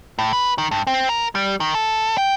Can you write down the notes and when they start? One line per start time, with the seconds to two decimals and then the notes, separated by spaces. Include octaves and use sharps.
0.19 A2
0.33 B4
0.58 D#3
0.71 G2
0.87 C4
1.09 A#4
1.35 G3
1.60 D#3
1.75 A4
2.18 G5